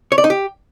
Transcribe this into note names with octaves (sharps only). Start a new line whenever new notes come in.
C#5
D5
D#4
G4